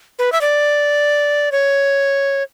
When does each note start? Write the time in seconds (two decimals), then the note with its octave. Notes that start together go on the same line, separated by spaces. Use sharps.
0.19 B4
0.32 E5
0.41 D5
1.52 C#5